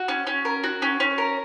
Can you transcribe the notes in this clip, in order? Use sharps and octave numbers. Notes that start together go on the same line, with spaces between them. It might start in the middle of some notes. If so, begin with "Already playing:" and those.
Already playing: F#4
C#4
C#4
A#4
F#4
C#4
C#4
A#4